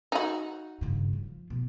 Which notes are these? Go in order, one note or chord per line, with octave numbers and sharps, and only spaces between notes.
D#4 F#4
G2 C#3
F3
B2